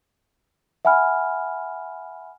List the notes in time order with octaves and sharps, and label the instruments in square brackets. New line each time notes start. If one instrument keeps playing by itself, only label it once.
[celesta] E5 F#5 G#5 B5 F6